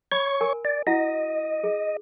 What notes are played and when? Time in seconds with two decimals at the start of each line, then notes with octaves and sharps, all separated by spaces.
0.12 C#5 B5 C#6
0.41 A#4 G#5
0.65 D5
0.87 E4 F#4 D#5 F#5
1.64 G#4